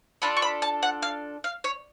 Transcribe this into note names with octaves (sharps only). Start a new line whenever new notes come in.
D4 F4 A4 B5
C#6
B5
A5
F#5
F5
F5
C#5